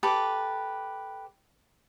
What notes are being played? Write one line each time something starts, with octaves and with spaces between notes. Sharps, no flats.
G4 A4 B4 D6